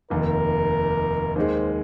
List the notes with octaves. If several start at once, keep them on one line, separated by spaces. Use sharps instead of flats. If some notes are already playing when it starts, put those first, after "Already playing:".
F1 D#2 D#3 A#4
D#2 D#3 G#3 C5